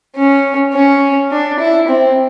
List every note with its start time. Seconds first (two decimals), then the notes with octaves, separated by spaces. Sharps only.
0.16 C#4
0.74 C#4
1.32 D4
1.59 E4
1.88 C4